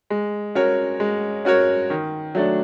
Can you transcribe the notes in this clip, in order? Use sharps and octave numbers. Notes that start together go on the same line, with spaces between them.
G#3
C#4 F#4 A#4 C#5
G#3
C#4 F#4 A#4 C#5
D#3
F#3 A3 D4